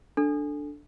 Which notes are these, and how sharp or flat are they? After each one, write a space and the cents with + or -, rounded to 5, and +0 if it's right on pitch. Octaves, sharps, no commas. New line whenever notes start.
D4 +0 A4 +0